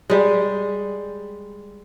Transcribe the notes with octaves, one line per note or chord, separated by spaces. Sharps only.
G3 G#3